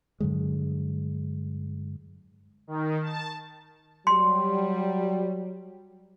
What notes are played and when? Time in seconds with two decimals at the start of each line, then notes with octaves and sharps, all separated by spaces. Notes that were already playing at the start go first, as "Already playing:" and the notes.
0.20 G2 D3 F#3 G#3
2.67 D#3
3.02 A5
4.07 F#3 G3 C6